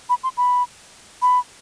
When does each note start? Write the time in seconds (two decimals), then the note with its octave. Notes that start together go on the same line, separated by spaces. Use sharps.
0.09 B5
0.23 C6
0.37 B5
1.22 B5